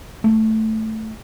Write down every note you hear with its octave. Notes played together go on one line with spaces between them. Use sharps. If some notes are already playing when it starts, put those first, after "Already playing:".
A3